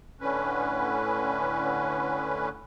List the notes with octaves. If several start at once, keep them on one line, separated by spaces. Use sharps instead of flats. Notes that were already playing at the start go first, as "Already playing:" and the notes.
A2 D3 C#4 B4